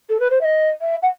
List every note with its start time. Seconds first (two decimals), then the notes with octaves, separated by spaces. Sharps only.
0.09 A4
0.20 B4
0.30 C5
0.41 E5
0.44 D#5
0.81 E5
1.02 F#5